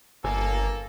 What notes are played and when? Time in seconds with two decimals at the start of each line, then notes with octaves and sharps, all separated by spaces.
0.24 G1 A#3 A4 G#5